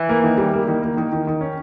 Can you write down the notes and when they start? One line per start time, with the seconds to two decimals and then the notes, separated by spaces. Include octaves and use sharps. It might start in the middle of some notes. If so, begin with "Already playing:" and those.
Already playing: E3
0.09 A#3
0.24 D#3
0.38 G3
0.53 A#3
0.68 D#3
0.82 A#3
0.97 D#3
1.13 D#3
1.27 D#3
1.41 C#4